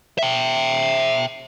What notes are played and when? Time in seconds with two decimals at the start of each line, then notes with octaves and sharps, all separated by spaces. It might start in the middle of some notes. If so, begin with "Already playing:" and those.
0.19 E5 G5